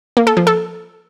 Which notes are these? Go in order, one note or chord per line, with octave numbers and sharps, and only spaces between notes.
A#3
A4
F3
A4